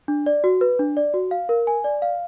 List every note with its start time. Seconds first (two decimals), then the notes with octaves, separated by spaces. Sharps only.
0.08 D4
0.26 D5
0.44 F#4
0.61 B4
0.79 D4
0.97 D5
1.14 F#4
1.31 F5
1.49 A#4
1.67 G#5
1.84 D5
2.02 F5